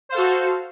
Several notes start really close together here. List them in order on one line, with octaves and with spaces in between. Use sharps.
C5 F5 A4 F#4